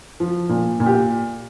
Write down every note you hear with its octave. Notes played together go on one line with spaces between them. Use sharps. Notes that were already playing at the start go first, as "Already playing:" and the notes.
F3
A#2
A#2
G4